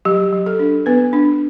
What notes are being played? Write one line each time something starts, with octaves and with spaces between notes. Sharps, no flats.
F#3 G4
F#3
A4
D4
B3 B4
D4